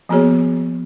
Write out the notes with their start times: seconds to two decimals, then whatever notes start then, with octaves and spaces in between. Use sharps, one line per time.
0.09 F3 A#3 B3 F#4 G#4 C#5